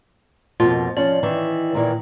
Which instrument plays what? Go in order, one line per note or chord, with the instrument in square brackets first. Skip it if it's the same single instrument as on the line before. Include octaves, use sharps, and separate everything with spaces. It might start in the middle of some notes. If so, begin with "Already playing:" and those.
[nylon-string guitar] F2 B2 A#3 [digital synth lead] F4
[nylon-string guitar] F3 C#4 [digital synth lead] D5
[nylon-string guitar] D#3 E3
A#2 D#3 E3